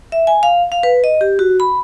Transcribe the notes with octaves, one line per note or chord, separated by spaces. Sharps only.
E5
G#5
F5
F5
B4
D#5
G4
F#4
B5